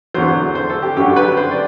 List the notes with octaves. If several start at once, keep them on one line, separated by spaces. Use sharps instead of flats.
E2 D3 F#3 C5
C5
A4
G4
F#2 D3 F#3 G4
B4
C5
D5